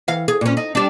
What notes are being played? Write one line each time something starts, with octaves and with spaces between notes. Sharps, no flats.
E3 F5
G#4
A#2 C#4
D#4
G3 D4